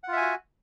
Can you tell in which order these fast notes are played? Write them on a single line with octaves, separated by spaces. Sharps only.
F#5 F4 E5 G#5 F#4